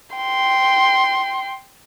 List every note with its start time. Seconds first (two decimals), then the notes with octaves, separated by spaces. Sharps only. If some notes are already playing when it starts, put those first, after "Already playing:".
0.16 G5 C6